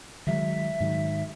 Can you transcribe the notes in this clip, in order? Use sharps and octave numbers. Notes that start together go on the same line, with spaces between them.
D#3 F#3 G#3 E5
G#2 D#3 F#3